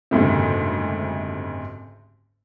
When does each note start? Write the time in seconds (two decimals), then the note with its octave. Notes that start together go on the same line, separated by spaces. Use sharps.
0.11 F#1 D2 G#2 C3